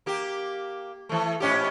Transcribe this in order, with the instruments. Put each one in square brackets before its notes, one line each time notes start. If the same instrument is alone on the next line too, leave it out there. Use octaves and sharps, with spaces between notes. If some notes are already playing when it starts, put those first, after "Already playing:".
[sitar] A#3 G4
E3 A3
G#2 C#4 G4